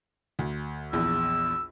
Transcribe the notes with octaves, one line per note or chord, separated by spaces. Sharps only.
D2
A#1 E2 E6